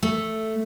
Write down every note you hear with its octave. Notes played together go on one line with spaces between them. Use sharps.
A3